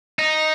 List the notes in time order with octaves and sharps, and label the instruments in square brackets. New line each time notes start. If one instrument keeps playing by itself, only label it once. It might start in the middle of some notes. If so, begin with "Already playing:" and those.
[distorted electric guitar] D#4